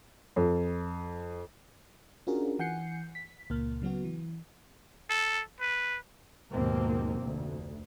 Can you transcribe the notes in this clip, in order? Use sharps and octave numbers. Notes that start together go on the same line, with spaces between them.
F2
C#4 D4 F4 F#4 G#4 A#4
E3 F#5 G#5 G6 C7 C#7
B6
C#2 A#2 A#3 F6
C#3 F#3 B3 F#4
E3
A4
B4
D#2 G#2 B2 F3 A#3 C4
F1 D2